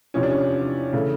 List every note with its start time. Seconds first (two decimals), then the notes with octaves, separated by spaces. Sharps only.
0.14 E2 C3 F3 C#4
0.23 D4
0.31 C#4
0.93 C#3 E3 A3